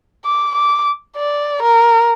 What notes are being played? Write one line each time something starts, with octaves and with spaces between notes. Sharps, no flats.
D6
D6
D5
A#4